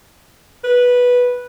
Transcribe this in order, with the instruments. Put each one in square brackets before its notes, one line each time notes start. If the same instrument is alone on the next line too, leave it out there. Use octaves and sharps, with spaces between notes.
[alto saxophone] B4